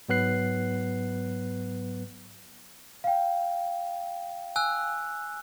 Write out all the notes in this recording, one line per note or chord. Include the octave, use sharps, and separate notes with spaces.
G#2 F#3 B3 B4 F#6 C7
F5 G5
G#5 E6 F#6